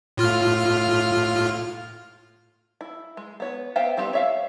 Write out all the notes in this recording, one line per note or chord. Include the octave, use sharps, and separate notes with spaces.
A2 F4 F6
E4
G#3
B3 C#5
B3 C5 E5 F5 G5
G3 B3 C4 G4
C#5 E5 F5